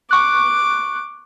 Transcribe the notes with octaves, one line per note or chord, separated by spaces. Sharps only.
C#6 D6 F#6